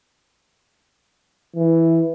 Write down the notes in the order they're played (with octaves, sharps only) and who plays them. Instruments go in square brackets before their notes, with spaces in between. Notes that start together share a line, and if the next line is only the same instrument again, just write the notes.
[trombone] E3